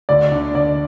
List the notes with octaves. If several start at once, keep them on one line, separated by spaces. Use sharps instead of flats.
D2 D5
D3
D3 D5